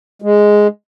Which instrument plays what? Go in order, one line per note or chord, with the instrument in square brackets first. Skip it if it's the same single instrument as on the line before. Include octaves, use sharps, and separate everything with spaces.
[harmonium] G#3